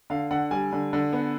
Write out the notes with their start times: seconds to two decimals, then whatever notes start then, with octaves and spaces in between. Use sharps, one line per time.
0.10 D3 F5
0.31 D3 F#5
0.51 G3 G#5
0.72 D3
0.93 D3
1.13 B3